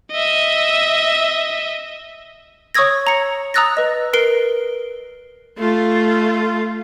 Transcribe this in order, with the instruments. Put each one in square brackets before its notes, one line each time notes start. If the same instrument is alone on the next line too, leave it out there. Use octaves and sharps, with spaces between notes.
[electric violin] D#5 E5
[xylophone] C#5 C#6 D#6 E6 G#6 A#6
A#5 C#7
A#5 D#6 E6 F#6 A6 A#6
B4 D#5
A#4 B4 C7 D7 G7
[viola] A3 F4